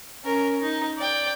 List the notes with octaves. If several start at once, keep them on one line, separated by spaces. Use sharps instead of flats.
C#4 A#4
D#4
D5 G5